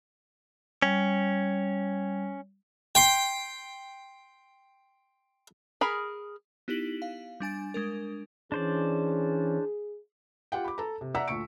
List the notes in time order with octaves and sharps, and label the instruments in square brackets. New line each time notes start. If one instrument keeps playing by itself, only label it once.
[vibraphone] G3 [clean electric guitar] C#4
[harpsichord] G5 C6
[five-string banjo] G#4 A#4 B5
[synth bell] B3 D#4 E4 G4 B6 F#7
F5
G3 D4 G#5 A6
G#3 D4 A#4
[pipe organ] E3 C#4 [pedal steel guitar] D4 C5 D5 [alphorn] G#4
[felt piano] F4 G4 F#5 G5
B5 D6
A4 A#5
C3
D5 E5 F#5 A#5 E6 B6
D2 A#2 C#6 C#7 D7